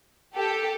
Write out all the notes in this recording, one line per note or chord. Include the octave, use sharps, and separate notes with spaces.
G4 A4